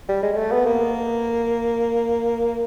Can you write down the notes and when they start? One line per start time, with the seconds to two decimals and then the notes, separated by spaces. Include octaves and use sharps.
0.09 G3
0.23 G#3
0.33 G#3
0.37 A3
0.51 B3
0.66 A#3